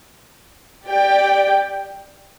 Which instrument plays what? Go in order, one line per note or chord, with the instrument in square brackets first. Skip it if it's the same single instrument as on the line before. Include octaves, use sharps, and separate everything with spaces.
[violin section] G4 D5 G5